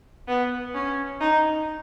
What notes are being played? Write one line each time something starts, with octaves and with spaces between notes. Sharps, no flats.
B3
C#4
D#4